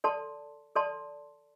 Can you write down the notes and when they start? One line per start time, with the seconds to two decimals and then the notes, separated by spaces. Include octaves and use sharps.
0.04 A4 D5 A5 C6
0.76 A4 D5 A5 C6